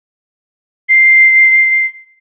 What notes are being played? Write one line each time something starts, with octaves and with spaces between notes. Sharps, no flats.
C7